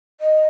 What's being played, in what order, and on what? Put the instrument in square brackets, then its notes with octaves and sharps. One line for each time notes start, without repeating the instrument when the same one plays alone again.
[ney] D#5